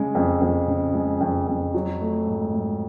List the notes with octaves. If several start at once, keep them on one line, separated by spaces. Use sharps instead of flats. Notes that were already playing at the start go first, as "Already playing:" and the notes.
Already playing: C#3 G#3
F2
F2
C#3
G#3
F2
F2
F#3
A3
G#2
G#2